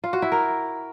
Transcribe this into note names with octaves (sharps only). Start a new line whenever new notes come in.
F4
F#4
E4
A#4